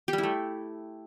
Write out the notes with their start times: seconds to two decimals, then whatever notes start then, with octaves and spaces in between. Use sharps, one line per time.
0.08 G4
0.13 G3
0.18 E4
0.23 A3